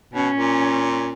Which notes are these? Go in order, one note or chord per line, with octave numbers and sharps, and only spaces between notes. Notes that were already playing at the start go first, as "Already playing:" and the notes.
B2 C#4
A#2